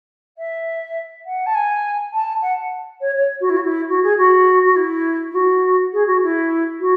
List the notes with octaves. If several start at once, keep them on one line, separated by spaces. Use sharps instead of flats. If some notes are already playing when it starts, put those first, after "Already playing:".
E5
F#5
A5
G#5
A5
F#5
C#5
C#5
F#4
E4
F#4
E4
F#4
G#4
F#4
F#4
E4
E4
F#4
G#4
F#4
E4
F#4